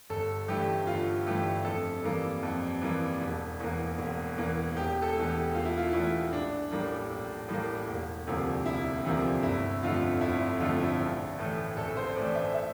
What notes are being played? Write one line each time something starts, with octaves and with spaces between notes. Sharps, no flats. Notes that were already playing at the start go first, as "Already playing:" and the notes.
G1 A4
G2 E3 A3 G4
G1 F4
G2 E3 A3 G4
F2 A4
E3 G3 A#3
F2
E3 G3 A#3
E1
E2 E3 A#3
E1
E2 E3 A#3
E1 G4
A4
E2 E3 A3
G4
E1 F4
E4
F4
E2 E3 A3 E4
A#1 D4
A2 G3 A#3
A#1
A2 G3 A#3
E1
D2 C3 F3 A#3
E1 E4
D2 C3 F3 A#3
G1 E4
F2 D3 A3 F4
G1 E4
E4
F2 D3 A3 F4
E4
A#1
A2 E3 A3
A#1 A4
C5
A2 E3 A3 D5
E5
E5